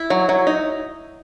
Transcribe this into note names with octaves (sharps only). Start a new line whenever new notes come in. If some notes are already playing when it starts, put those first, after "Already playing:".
Already playing: E4
F#3
F#3
D#4